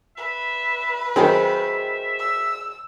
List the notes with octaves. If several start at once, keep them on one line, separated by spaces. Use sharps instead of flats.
B4 E5
D#3 F#3 C4 G#4 C5 E5 G5
E6